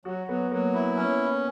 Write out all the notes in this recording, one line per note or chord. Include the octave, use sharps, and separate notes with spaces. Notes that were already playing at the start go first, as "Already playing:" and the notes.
F#3 F#4
F#3 B3
F#3 A#3
E4
C#4